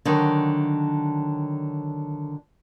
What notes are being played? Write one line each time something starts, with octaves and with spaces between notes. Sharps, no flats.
D3 D#3 F#3